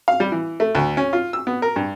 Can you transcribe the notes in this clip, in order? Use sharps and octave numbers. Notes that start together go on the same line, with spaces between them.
F5
G3
E3
A3
D2
C#4
F4
E6
B3
A#4
G2